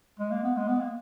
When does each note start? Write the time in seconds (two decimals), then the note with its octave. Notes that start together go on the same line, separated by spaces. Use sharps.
0.19 G#3
0.31 A#3
0.43 B3
0.56 G#3
0.68 B3
0.81 A#3